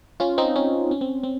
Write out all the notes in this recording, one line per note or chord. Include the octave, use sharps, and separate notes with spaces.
C#4 F4
C4 D#4
C#4
C#4
C4
C4